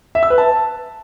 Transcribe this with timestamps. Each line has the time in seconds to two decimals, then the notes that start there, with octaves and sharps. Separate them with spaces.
0.15 E5
0.23 E6
0.30 B4
0.38 A5